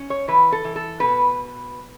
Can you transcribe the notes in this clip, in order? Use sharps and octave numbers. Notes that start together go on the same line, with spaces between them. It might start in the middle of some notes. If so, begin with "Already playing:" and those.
Already playing: C#4
C#5
E3 B4
A4
E3
A4
B2 B4